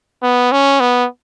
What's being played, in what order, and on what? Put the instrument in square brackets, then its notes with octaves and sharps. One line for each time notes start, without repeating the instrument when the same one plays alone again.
[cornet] B3
C#4
B3